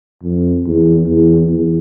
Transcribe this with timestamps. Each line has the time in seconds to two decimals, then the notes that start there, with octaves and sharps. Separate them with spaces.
0.23 F2
0.66 E2
1.08 E2
1.49 E2